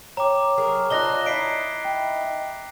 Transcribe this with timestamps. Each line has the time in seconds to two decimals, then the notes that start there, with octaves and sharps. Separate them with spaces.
0.17 C#5 G5 A#5 D6
0.58 F#3 G#4 A#4
0.90 D4 D#4 F4 F#6 A#6 G7
1.26 D#4 E4 B6 C7 D7
1.85 G5